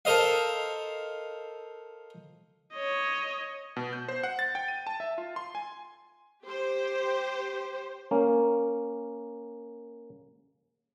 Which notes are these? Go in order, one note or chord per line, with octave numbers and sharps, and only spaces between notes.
A4 A#4 C5 D#5 F5
C#5 D#5
B2
G6
C5
F#5
A6
G5
D#7
A5
E5
F4
C6
G#5
G4 C5
A#3 C#4